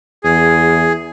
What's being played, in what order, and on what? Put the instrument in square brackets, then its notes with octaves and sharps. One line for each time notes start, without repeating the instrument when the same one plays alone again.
[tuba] E2 [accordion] G#4